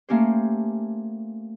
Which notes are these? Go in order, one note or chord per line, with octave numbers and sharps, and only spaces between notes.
A3 A#3 C#4 G4 C5